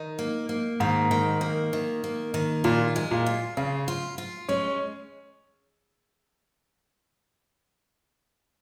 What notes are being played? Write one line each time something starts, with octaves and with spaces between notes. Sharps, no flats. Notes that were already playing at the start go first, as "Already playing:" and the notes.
Already playing: D#3 D#4
A#3
A#3
G#2 D#3
D#3
A#3
D#3
A#3
D#3
A#2 F4
G#3
A#2
F4
C#3 F4
F4
F4
G#3 C#4